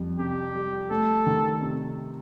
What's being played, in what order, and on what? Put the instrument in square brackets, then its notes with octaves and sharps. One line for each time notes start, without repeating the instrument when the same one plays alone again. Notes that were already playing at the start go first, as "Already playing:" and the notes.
Already playing: [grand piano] F2 G3
[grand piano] C3 [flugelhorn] G4
[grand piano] G3
[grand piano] A3 [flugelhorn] A4
[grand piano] D#3
C3